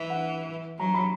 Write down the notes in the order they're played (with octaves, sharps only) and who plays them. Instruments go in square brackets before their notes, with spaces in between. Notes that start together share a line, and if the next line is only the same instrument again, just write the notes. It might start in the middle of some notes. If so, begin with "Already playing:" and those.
Already playing: [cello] E3
[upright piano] F#5
[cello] F#3 [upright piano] A#5
[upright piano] B5